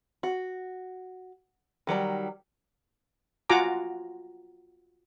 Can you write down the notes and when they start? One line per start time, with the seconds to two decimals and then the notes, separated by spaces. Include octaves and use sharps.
0.23 F#4
1.87 D#3 F#3 G3 A#5
3.49 F4 F#4 F#5 G#5 A#5 D6